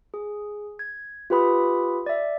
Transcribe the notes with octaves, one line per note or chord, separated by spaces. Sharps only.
G#4
G#6
F4 G4 B4 B5 D#6
D5 E5